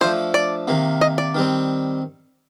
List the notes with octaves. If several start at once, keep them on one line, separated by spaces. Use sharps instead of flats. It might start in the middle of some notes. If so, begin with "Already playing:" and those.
F3 A3 D4 C5
D5
C3 D#3 A#3
D#5
D5
D#3 G3 C4